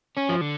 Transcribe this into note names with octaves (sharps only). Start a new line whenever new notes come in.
C#4
F3
D3